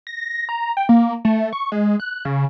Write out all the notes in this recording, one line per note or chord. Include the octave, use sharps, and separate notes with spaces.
A#6
A#5
G5
A#3
A3
C#6
G#3
F#6
C#3